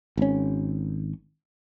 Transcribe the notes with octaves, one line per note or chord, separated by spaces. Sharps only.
G#1 C#4